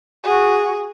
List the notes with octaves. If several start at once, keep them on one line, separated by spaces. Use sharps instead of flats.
F#4 G#4